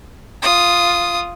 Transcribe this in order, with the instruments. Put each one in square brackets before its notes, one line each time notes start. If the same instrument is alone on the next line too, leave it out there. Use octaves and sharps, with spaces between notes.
[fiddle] F4 D#6